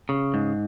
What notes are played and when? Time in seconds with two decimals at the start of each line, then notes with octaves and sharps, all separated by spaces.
0.09 C#3
0.34 G#2